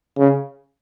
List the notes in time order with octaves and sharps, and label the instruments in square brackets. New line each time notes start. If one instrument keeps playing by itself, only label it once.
[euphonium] C#3